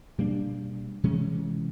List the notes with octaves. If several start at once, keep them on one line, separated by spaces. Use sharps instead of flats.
B2 G3 A#3 D4
C3 E3 G#3 C#4